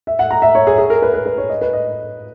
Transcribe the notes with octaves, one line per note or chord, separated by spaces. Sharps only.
E5
F#5
A#5
E5
C#5
G#4
G#4
A#4
B4
B4
B4
C#5
D#5
B4
D#5